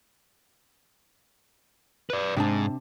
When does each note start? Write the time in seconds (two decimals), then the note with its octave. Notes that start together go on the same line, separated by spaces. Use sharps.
2.10 B4 D5
2.36 G#2 C3 D4 A5